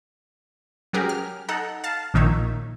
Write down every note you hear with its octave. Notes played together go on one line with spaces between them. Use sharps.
F#3 C#4 G4 G#4 A#4
F6
D#4 A4 F#5 A#5
F5 A5
A#1 A#2 D#3 D#4 C#5 E5